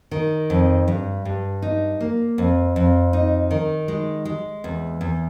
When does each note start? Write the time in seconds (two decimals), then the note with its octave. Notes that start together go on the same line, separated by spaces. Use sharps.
0.11 D#3
0.50 F2
0.88 G2
1.25 G2
1.62 D#4
2.00 A#3
2.38 F2
2.76 F2
3.13 D#4
3.51 D#3
3.88 G#3
4.25 G#3
4.64 E2
5.01 E2